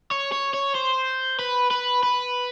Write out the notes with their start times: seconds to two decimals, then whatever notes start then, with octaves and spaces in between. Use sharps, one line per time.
0.11 C#5
0.32 C#5
0.53 C#5
0.75 C5
1.39 B4
1.71 B4
2.03 B4